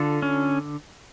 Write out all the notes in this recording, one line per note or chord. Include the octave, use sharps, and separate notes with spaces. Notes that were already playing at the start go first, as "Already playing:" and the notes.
Already playing: D3 F4 A4
C#4